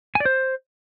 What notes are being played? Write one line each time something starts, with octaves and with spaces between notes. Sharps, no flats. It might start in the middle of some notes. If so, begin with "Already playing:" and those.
G#5
D5
C5